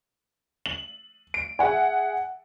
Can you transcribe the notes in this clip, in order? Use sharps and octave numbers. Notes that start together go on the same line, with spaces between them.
F#7
D7
G#4 E5 F#5 G#5